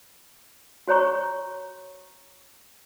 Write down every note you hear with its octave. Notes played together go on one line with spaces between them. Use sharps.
F#4 C5 C#5 A#5 C#6